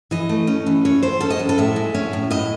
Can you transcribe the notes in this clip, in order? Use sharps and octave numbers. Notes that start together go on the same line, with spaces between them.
E3 D#5
A3
C#4
E3
E3 C#5
A3 C5
C#4 A4
D#5
A2
A4
A2 E5
G#3
C#4
A2
A2 D#5